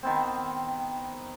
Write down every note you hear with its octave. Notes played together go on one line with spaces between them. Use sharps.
D#3 B3 C4